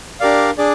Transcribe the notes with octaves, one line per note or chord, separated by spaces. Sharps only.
D4 G4 A#4 D5 F5
D4 G#4 D5